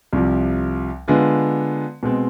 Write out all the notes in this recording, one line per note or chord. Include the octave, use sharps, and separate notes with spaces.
C2 C3 F3
D3 G#3 B3 F4
B2 G#3 C4